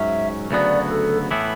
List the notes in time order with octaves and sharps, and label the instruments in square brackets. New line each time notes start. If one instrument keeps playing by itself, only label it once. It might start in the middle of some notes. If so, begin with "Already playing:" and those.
Already playing: [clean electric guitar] G#2 F#3 C#4 [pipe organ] E5
[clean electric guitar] D2 C#3 F#3 B3 F#4 [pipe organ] D5
[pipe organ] A4
[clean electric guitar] A2 E3 B3 E4